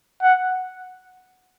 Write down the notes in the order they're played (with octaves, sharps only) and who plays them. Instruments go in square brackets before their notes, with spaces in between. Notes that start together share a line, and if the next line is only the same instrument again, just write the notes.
[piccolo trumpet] F#5